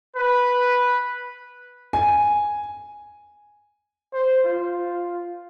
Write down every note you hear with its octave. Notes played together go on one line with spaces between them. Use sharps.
B4
G#5
C5
F4